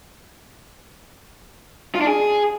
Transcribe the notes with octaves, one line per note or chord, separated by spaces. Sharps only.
F4
D4
G#4